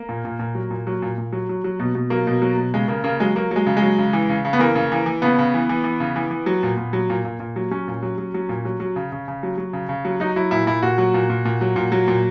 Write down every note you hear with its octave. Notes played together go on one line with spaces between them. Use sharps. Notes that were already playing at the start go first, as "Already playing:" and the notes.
Already playing: A#3
A#2
A#2
A#2
F#3
A#2
F#3
A#2
A#2
F#3
F#3
F#3
B2
B2
F#3 A#3
B2
F#3
B2
C#3 G#3
C#3 A#3
C#3 A#3
F#3 G#3
F#3 A#3
F#3 G#3
C#3
G#3
F#3
C#3
E3
C#3
C#3
B3
E3 A#3
C#3
E3
E3
C#3 B3
C#3
E3
E3
E3
C#3
E3
E3
F#3
A#2
A#2
F#3
A#2
A#2
A#2
F#3
F#3 C#4
A#2
F#3
F#3
F#3
A#2
F#3
F#3
C#3
C#3
C#3
F#3
F#3
C#3
C#3
F#3
F#3 D#4
F#3 E4
A#2 E4
A#2 E4
A#2 F#4
F#3
A#2
A#2
A#2
F#3
A#2
F#3
A#2